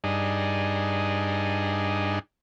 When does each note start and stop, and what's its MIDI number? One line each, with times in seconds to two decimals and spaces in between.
0.04 2.19 43
0.04 2.19 62
0.04 2.19 63
0.04 2.19 68